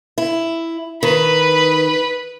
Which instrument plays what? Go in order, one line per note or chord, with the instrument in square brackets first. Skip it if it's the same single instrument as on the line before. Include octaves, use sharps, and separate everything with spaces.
[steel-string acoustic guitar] E4
[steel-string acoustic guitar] D#3 [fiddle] B4